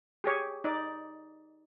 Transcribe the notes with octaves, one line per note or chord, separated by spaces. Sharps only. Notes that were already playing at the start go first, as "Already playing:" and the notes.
G4 G#4 C#5
D#4 D5